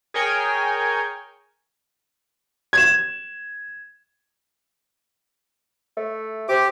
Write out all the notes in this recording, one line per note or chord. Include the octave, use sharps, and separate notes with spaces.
G#4 A#4 C#5 G5 G#5
G#6 E7
A3
C4 G4 D6